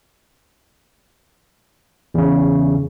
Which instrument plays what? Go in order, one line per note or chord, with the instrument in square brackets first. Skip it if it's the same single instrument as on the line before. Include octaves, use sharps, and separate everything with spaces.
[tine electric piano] E2 C#3